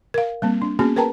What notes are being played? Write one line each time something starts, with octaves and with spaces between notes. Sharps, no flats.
A#4 F5
G3 A#3 C4
D4
A#3 B3 C#4 F#4 G#4
G#4 A#4 B4 G5 A5 A#5